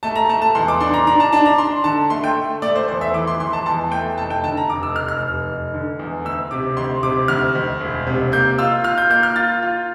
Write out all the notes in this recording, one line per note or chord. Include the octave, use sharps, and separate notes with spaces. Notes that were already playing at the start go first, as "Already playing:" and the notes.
A3 A5
A#5
A3 A5
A5
E2 C6
D6
D4 C6
A#5
D4 A#5
A5
D4 A5
A#5
D4 C6
D3 A5
A3 C6
G5
A3
A3 D5
C5
E2 C5
E5
E3 D6
C6
E3 C6
A5
E2 A5
A3 G5
F1 A5
G5
D3 A5
A#5
F1 D6
E6
F1 F6
F6
F1
F1
D3
E2
D2 E6
C3 D6
D2 C6
C3 D6
D2 F6
D2
E1
C3
A#3 G6
F4 E6
F4 F6
G6
A#3 G6
F6
F4 A6
F4